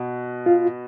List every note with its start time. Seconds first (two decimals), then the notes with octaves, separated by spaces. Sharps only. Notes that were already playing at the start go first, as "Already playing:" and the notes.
Already playing: B2
0.46 F4